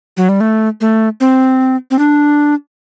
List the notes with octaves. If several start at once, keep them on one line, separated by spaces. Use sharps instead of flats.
F#3
G3
A3
A3
C4
C4
D4